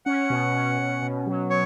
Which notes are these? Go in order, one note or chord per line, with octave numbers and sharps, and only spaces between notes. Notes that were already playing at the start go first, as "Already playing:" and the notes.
C#4 F#5
B2
C#4
B2
B2
F#3
F#3 C#5